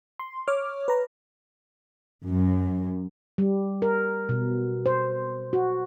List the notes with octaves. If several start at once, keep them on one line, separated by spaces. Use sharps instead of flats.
C6
C#5 D6 F6
B4 A#5
F#2
G3
A#4
B2
C5
F#4